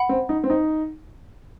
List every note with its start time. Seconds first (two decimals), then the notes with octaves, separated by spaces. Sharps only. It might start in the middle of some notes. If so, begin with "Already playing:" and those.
Already playing: F#5 B5
0.09 C4
0.29 D#4
0.44 C4
0.50 D#4